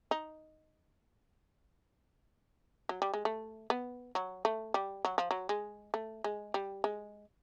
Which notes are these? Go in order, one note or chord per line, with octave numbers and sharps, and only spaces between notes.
D#4
F#3
G3
G#3
A3
B3
F#3
A3
G3
F#3
F3
F#3
G#3
A3
G#3
G3
G#3